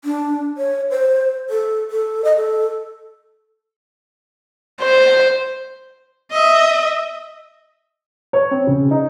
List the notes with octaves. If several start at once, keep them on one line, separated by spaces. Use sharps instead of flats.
D4
C#5
C5
A4
A4
D#5
A4
C5
D#5 E5
C#5
C4
C#3
D#4